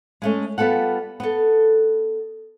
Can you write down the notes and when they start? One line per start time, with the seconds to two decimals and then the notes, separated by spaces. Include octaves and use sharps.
0.22 G#3 A3 C#4
0.58 G3 B3 F4 A4 F#5
1.20 B3 A4